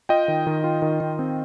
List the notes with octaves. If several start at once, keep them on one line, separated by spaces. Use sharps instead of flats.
F4 D#5 G5
D#3
D#3
F4
D#3
D#3
C4